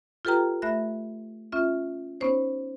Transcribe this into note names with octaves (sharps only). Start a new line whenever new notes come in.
F4 G4 A4 B4 G5 A#5
A3 E5 B5 F#6 A#6
C#4 F4 E5
B3 C#4 D#4 C5 C#5